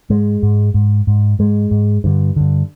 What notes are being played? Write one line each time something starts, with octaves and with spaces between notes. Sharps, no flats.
G#2 G#3
G#2
G#2
G#2
G#2 G#3
G#2
G2 D3
G2 D3